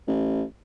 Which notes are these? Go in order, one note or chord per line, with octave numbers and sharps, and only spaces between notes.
A1